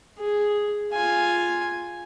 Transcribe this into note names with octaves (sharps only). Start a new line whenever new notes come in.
G#4
F4 G#5